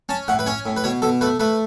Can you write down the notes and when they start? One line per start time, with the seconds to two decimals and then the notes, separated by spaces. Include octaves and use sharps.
0.09 C#4 A5
0.28 A2 F#5
0.39 B4
0.46 C#4 C#5
0.66 A2
0.76 B4
0.84 B2 C#5
1.02 B2 A4
1.21 A3 B4
1.40 A3 B4